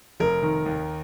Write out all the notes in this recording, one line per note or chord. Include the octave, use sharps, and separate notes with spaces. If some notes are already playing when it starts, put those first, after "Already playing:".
F1 A#4
D#3
D#2